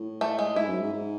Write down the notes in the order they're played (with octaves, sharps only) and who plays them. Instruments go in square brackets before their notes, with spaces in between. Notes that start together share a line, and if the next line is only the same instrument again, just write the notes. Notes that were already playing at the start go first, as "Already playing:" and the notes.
Already playing: [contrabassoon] A2
[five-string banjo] A3
G#3
[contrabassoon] G#2 [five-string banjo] E4
[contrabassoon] F#2
G#2
G#2